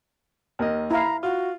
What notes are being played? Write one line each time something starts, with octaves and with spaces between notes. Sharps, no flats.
D#2 A#4 D#5
E4 F5 A#5
F4 F#4